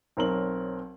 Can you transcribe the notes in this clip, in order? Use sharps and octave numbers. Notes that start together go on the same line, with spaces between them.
B1 C4 A#4 C#5 F#7